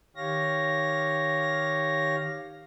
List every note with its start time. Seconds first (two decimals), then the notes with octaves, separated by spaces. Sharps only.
0.16 D#3 G4 C#5 F5 A#6